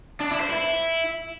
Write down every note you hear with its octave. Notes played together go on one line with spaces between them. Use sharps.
D4
E4
C5
E4